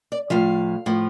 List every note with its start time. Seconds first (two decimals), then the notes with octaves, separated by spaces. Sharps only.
0.12 D5
0.30 A2 F3 F5
0.86 A2 F3